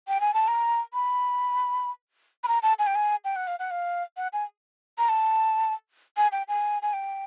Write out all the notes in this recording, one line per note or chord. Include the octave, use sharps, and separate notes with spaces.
G5
G#5
A5
A#5
B5
B5
A#5
A5
G#5
G5
G#5
G5
F#5
F5
F#5
F5
F#5
G#5
A#5
A5
G#5
G5
G#5
G#5
G5